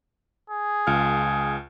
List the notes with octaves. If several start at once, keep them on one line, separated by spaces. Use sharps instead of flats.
G#4
C#2 F4 F6